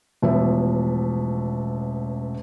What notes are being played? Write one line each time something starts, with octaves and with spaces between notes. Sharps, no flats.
E1 A1 F3 B3 C#5 E5